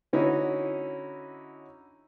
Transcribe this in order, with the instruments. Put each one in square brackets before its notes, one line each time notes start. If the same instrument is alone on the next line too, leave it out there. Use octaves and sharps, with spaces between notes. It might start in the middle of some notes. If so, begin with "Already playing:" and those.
[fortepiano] D3 C#4 D#4 E4 F#4